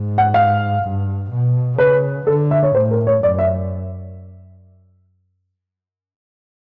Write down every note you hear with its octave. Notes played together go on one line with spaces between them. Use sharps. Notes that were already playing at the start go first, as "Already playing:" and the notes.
Already playing: G#2
F#5
F5
G2
B2
C#3 B4
D3 A4
E5
C#5
A2 C5
A#4
C#5
F#2 D5
E5